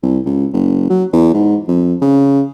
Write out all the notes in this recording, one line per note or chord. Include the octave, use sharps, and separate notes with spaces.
C2
C#2
F#1
F#3
E2
G#2
F2
C#3